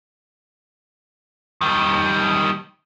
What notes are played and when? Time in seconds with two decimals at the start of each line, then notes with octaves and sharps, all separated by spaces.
1.61 D#3 G3